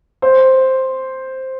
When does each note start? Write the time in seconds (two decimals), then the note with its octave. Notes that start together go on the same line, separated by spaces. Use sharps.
0.22 C5